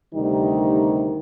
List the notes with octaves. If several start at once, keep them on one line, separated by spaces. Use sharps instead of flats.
D2 C3 D#3 G3 D#4